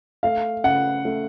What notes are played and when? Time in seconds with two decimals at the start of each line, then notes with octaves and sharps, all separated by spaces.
0.23 A3 F5
0.64 C#3 F#5
1.05 A3